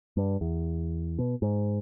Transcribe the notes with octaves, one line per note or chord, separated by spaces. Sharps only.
G2
E2
B2
G#2